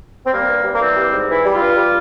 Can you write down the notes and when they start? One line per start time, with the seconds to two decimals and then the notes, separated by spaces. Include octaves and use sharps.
0.24 C4
0.30 G3 A#3
0.47 G2
0.63 G3
0.73 A#3
0.80 E3 C4
0.95 G3
1.12 G#2
1.28 E3 E4
1.45 G3
1.53 F4
1.60 G2
1.77 G3